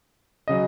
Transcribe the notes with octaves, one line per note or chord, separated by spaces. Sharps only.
C#3 F#3 D#5